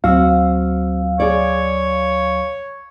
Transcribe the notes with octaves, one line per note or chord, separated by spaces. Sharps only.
D2 F#3 C4 F#4 F5 E6
G#4 C#5 D5